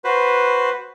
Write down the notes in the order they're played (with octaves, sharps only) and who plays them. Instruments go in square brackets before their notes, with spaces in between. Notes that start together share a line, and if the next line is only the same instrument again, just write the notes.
[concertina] F#4 B4 C5